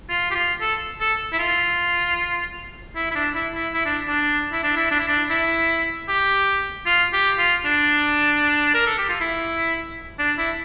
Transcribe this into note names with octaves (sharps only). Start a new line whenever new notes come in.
F4
G4
F4
A4
A4
E4
F4
E4
E4
D4
E4
E4
E4
D4
D4
E4
D4
E4
D4
E4
D4
E4
G4
F4
G4
F4
D4
A#4
A4
G4
F4
E4
D4
E4